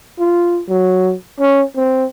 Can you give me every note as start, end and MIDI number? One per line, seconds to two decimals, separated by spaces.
0.19 0.61 65
0.68 1.14 54
1.40 1.62 61
1.76 2.05 60